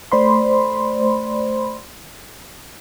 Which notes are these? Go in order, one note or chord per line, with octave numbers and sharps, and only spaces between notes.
A3 C5 D5 B5 C6